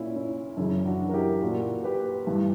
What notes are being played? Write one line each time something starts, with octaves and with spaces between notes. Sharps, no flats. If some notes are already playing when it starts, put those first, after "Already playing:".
Already playing: A#2 C#4 E4
C#4 E4
F#2 C#3 E3 C#4 E4
D4 F#4
A#4
E4 G4
A#2 F#4 A#4
G4 B4
G2 E3